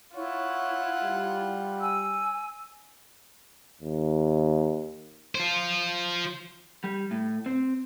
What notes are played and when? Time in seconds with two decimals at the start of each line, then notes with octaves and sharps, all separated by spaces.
0.16 E4 F4 C#5 F#5
1.03 G3
1.81 G#5 E6
3.82 D#2
5.35 F4 C5
6.84 G3
7.11 A2
7.46 C4